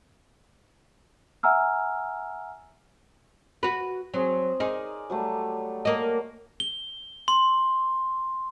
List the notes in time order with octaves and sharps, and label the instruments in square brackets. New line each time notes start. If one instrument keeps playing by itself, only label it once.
[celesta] E5 F#5 G#5 A#5 E6 F6
[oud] F#4 B4
[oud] F#3 [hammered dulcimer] C4 G#4
[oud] D#4 G#4 [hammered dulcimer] A#4 C#5 D5
[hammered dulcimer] F#3 G3 A3
[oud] A#3 D#5
[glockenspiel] G7
C6